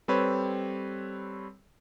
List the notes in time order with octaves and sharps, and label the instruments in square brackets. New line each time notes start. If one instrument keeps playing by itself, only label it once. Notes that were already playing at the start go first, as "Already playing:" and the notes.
[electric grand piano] G3 C4 A4 B4 C#5